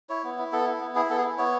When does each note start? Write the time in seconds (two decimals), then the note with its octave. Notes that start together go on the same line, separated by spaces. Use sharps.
0.09 E4 C#5
0.24 B3
0.38 E4
0.53 B3 A4
0.67 E4
0.81 B3
0.95 E4 G#4
1.10 B3 A4
1.17 G#4
1.24 E4
1.38 B3 C#5